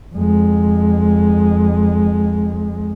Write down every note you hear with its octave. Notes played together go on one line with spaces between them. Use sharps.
F2 G#3